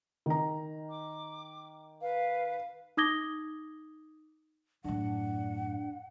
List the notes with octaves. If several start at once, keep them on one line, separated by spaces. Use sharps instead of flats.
D#3 A#5
D6
B4 F5
D#4 D6 D#6 G#6 A#6 G7
F#2 A2 D4 F#5